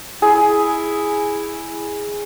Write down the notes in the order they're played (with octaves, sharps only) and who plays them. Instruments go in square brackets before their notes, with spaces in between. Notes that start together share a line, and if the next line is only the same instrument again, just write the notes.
[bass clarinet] E4 [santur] G#4